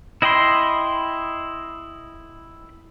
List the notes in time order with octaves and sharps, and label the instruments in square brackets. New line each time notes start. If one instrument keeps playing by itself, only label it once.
[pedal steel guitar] E4 D#5 G5 B5 C6